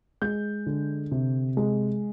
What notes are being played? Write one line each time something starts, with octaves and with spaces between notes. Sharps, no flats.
G#3 G6
D3
C3
G#3